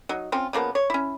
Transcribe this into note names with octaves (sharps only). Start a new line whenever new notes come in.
F#3 D#4
C4 C#4 F4
C#3 F3 A#3 B3
C#5
C#4 E4